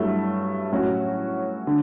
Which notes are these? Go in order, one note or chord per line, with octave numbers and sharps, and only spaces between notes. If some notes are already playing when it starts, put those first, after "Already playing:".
Already playing: G2 F#3 A3 E4
A2 F#3 C#4 F#4
D3